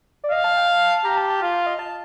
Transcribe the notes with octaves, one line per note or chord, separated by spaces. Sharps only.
D5
D#5 F5
A5
G5
A5
G4 A#5
A5
A5
F4 F5
F5
D#5
A5